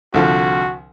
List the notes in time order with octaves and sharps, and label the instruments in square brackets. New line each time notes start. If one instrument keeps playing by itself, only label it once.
[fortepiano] C2 D3 F3 [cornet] F#4